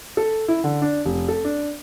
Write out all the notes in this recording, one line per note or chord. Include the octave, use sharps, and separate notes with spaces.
A4
E4
D3
D4
F1
A4
D4